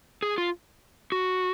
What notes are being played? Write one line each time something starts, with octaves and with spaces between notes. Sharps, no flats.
G#4
F4
F#4